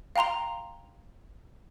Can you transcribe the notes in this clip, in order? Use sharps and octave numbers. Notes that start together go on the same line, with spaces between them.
F5 G5 A#5 C6 F7